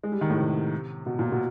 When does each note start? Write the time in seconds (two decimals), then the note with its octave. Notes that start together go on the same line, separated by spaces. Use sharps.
0.03 G#3
0.12 G3
0.21 D#3
0.29 A2
0.38 C3
1.06 B2
1.19 A#2
1.32 B2